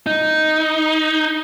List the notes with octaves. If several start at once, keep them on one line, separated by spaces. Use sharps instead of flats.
D#4